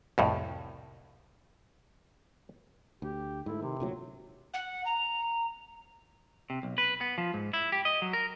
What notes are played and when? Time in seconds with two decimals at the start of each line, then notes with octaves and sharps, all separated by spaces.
0.18 C2 F2 A2
3.02 D2 G4
3.46 G#2 A3 E4
3.62 C3 D#3
3.80 D2 A#2 F#3
4.53 F#5
4.85 A#5
6.50 C3
6.63 B1
6.78 B4
7.01 B3
7.18 F3
7.34 G#2
7.53 E4
7.72 G4
7.85 D#5
8.02 F#3
8.13 A#4